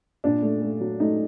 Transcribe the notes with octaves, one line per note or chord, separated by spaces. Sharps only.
A#2 D4
A3
A3
F#3
A3 D#4